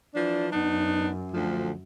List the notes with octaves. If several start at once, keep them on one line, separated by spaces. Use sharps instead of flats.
E3 F3 D4
F#2 B3 D4 D#4
D2 F3